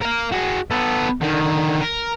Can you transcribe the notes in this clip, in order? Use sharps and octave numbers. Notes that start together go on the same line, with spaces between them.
A#4 F5
F#4 G#4
B3 A4
D3 D#3
A#4